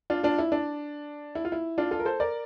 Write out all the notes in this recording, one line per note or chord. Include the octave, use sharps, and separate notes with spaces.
D4 F4
D4 F4
E4
D4
E4
F4
E4
D4 F4
F4 A4
A#4
A4 C5
A#4 D5